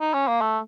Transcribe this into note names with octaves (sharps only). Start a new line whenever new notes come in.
D#4
C#4
A#3
A3